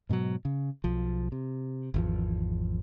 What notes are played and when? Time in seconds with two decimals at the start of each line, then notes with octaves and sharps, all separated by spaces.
0.09 G#2 B2 F3 F#3
0.45 C#3
0.84 B1 F3
1.32 C3
1.94 G#1 E2 F3